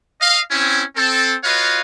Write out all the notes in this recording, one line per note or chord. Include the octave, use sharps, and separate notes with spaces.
D#5 F5
C4 C#4 E4
C4 A4
F4 F#4 B4 C#5 D#5 F5